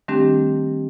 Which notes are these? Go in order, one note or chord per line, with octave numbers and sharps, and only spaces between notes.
D#3 G3 A3 C4 D4 G4